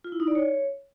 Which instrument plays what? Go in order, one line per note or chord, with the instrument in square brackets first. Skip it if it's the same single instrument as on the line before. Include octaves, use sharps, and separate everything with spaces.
[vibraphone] F4
E4
D#4
D5
C#5